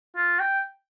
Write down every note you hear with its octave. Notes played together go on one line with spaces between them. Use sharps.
F4
G5